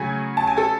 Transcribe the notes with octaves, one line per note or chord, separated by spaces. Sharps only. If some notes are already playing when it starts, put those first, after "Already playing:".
Already playing: C#3 F#3 A3 G#4 G#5
A5
G#5
A4 A5